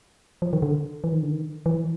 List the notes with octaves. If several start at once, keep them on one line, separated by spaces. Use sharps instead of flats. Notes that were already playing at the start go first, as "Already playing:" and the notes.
F3
D#3
D3
E3
D#3
D3
D#3
E3